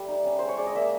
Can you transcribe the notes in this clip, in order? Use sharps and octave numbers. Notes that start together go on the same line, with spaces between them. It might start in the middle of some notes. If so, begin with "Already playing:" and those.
Already playing: G3 A3 E5
D#4
C#4
G#3 C5
C#5
G#3 D5
D#5
A#3 E5